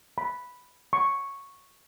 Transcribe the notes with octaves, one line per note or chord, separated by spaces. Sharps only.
B5
C#6